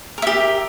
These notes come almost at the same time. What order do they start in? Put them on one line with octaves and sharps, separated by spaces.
A#4 E5 G4